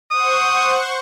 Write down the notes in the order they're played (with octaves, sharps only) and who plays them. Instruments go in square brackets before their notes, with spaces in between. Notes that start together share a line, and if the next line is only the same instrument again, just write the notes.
[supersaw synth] C5 F#5 C#6 [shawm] D#6